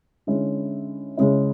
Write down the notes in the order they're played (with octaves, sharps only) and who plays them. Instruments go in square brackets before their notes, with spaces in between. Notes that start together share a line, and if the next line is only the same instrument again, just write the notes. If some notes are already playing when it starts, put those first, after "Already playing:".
[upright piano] D3 G#3 C#4 E4
C#3 G#3 C#4 E4